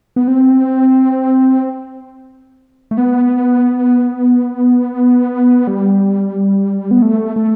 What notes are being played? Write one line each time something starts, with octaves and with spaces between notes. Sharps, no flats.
B3
C4
A3
B3
G3
B3
A3
A3